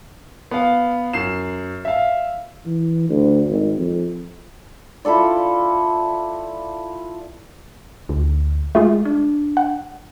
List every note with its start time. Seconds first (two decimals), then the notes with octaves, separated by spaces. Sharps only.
0.51 B3 F5
1.13 F#2 C7 E7
1.85 E5 F5
2.66 E3
3.09 D2
3.49 G#1
3.78 F2
5.05 E4 F4 A4 D5
8.09 D2
8.75 G#3 A3 F4 G#4
9.05 D4
9.57 F#5